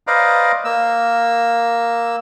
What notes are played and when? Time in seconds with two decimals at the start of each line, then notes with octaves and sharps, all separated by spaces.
0.07 B4 C5 D5 D#5 F5 A#5
0.65 A#3 E6